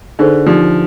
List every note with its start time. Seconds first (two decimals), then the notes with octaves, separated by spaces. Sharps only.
0.19 D3 D#4 G#4 C5
0.46 F3 D#4 G4 D5